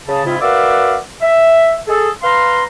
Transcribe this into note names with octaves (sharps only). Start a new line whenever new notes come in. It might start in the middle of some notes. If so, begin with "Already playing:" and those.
C#3 A5
G#2 C#3 C4 E4 F4
F#4 A#4 B4 D5 E5 F5
E5
G#4 A4
B4 F5 A#5 C6